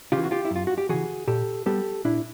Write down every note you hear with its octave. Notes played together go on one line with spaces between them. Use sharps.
C#3 E3 F4 G4
F#4
F4 G4
E4
F#2 F4
F#4
G4
C#3 E3 F#4 G#4
A#2 G4 A4
G3 B3 G4 A4
A#2 D4 E4